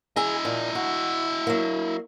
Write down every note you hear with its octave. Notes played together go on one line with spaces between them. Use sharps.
E4 G#4 D#5 G#5 A#5
A#2
F#4
F#3 A#3